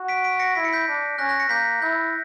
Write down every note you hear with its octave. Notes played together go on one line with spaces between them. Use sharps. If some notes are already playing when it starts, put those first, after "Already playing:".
Already playing: F#4
B6 D7
B6 D7
A#6 C#7
E4 B6
C#7
G6 B6
D4
C#4 F#6 A#6
F#6 A#6
A#6 C#7
A#3 G6 B6
E4 G6